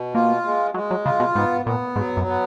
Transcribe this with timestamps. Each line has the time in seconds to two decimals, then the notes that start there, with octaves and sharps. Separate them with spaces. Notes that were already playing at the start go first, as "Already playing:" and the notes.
Already playing: B2
0.15 A#3 F4
0.44 G#3
0.74 F#3 G#3
0.91 F#3
1.05 C#3 F4
1.20 B2
1.35 G#2 B3
1.66 A#2 B3
1.96 G#2 F#3
2.17 F#2
2.27 B3